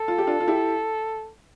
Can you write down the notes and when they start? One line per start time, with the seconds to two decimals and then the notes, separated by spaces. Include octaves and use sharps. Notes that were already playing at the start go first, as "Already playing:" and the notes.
Already playing: A4
0.08 F4
0.18 G4
0.27 D4 F4
0.40 F4
0.48 E4 G4